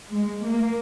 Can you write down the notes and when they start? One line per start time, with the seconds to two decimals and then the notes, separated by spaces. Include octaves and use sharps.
0.12 G#3
0.43 A#3